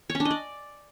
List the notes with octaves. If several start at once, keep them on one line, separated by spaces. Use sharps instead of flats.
C#5
C#4
D4
D#5
D5